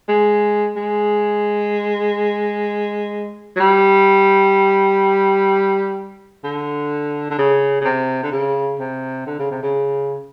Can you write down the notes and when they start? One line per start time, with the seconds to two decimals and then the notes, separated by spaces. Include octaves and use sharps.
0.09 G#3
0.77 G#3
3.56 F#3
3.60 G3
6.44 D3
7.31 D3
7.39 C#3
7.81 C#3
7.85 C3
8.23 D3
8.32 C#3
8.80 C3
9.26 D3
9.39 C#3
9.51 C3
9.63 C#3